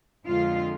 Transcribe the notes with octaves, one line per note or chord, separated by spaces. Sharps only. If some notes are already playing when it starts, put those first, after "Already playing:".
F2 D3 G#3 F4